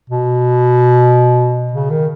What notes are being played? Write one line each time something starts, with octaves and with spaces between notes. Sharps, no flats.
B2
C#3
D#3